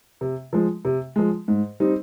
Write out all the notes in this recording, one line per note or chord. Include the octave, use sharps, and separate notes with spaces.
C3
F3 G#3
C3
F3 G#3
G#2
G3 C4 D#4